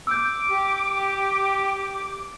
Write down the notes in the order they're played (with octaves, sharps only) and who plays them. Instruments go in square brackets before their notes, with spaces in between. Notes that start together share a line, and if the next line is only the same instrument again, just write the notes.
[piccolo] D6 [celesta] E6 G6
[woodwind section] G4